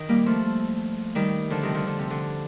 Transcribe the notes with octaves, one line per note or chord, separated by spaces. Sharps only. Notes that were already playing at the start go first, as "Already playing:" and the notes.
Already playing: D#3
G3 A#3
F3 A3
D#3 G3
D3 F3
C3 D#3
D3 F3
D3
C3
D3